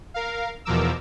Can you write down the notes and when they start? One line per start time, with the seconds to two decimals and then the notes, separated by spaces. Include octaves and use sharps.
0.14 A#4 F5
0.65 E2 B2 F3 A#4 D6 E6